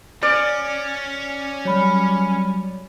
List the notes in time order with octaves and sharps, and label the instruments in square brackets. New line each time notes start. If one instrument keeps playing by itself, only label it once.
[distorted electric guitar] C#4 [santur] D5 [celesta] F6 D7
[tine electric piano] F#3 G3 [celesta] C#5 B5 F6